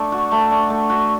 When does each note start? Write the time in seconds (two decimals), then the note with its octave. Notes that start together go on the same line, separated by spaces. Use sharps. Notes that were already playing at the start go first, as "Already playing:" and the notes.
Already playing: A3 D4
0.12 F#4
0.31 A3
0.51 D4
0.70 A3
0.90 F#4